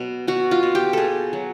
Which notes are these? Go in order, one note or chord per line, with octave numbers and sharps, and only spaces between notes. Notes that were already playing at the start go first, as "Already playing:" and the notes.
Already playing: B2 F#3
B2 F#4
F4
B2
G4
B2 G#4 A4
F#3